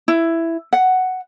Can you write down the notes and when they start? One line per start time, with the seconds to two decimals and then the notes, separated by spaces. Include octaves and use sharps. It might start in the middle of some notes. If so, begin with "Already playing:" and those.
0.08 E4
0.73 F#5